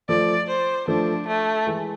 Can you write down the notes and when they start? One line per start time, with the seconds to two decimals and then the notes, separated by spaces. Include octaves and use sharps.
0.09 F3 A3 D5
0.48 C5
0.88 F3 A3 D4
1.28 A3
1.67 E3 G#3